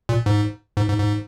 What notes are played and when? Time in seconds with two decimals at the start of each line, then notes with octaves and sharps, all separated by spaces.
0.09 A#2
0.26 G#2
0.77 G#2
0.88 G#2
0.99 G#2